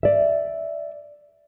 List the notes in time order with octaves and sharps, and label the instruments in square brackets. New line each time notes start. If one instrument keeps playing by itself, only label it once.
[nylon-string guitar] D5 E5